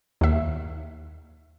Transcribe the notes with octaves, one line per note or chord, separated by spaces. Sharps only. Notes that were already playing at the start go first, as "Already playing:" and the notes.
D#2 E5